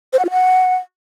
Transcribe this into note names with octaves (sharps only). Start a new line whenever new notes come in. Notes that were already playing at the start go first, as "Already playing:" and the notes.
C5
F#5
F4
F#5